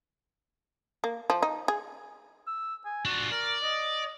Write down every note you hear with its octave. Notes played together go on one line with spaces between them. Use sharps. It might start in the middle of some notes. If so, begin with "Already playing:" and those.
A#3
F3
D#4
G#4
E6
G#5
D4 F4 F#4
A#4 D5
D#5